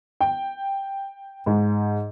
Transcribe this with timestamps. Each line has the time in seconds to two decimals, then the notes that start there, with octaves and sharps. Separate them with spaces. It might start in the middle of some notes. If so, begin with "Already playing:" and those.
0.21 G5
1.46 G#2